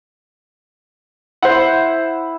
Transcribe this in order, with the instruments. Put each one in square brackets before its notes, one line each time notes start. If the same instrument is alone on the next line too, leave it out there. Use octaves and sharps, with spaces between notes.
[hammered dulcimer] E4 [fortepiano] C5 F#5